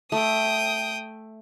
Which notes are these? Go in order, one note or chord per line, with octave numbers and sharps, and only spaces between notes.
A3 G5 D#6